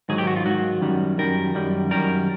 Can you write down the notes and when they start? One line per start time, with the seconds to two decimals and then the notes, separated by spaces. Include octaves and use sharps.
0.09 G#2 D#3 F#3 G#4
0.18 G4
0.27 F#4
0.36 F4
0.45 G#2 D#3 F#3 F#4
0.82 F#2 D#3 G3
1.18 F#2 D#3 G3 A#4
1.55 F#2 D#3 G3
1.91 F#2 D#3 G3 A#4